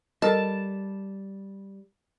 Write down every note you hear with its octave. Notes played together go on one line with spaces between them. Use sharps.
G3 A4 A#4 D#5 A5